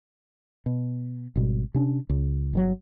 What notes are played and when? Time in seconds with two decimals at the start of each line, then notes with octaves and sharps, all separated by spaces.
0.66 B2
1.36 G#1 B2 G3
1.74 C3 C#4 D4
2.09 C#2
2.53 G1 A#2 F#3